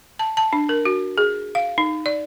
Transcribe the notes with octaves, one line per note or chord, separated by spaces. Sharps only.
A5
A5
D4
A#4
F#4
G#4
F5
D#4
D5